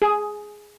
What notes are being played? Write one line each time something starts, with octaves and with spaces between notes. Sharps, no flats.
G#4